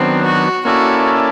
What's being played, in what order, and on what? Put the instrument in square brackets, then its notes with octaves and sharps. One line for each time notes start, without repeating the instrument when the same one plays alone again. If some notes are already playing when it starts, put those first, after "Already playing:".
Already playing: [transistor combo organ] D#3 F#3 B3 D4 [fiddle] C4
[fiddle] F#4
[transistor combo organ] A#3 C#4 E4 A4 D5 [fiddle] F#4